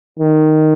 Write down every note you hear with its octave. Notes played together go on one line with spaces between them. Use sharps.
D#3